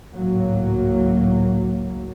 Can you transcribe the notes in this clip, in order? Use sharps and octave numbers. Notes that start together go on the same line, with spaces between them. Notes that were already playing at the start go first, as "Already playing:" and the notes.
G#1 C#2 A2 F#3 A#3